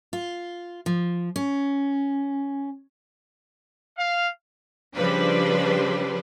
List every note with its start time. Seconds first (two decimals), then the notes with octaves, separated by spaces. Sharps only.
0.13 F4
0.86 F3
1.36 C#4
3.98 F5
4.96 C#3 F3 G3 D4 B4 C5